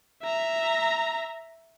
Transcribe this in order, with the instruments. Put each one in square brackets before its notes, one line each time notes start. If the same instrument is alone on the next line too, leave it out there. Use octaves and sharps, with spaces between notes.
[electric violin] E5 A#5